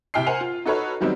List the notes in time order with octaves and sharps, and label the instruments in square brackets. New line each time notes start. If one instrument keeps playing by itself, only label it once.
[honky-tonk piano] C3 E4 G5 F6 C7
A#4 C5 F#5 G#5 F7
F4
D#4 F#4 A4 B4 C#5
D#3 F#3 G3 B3 C4 D#4